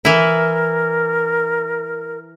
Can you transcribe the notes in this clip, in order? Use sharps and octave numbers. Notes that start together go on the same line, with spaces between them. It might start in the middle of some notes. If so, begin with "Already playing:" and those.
E3 E4 A#4